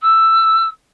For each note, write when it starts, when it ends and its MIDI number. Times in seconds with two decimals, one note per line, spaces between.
0.01 0.65 88